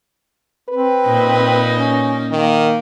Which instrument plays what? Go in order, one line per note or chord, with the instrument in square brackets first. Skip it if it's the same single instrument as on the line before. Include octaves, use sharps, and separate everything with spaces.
[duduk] C4 [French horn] B4
[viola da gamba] A#2 D#4
[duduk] C#4
[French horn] D#3 [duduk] A#3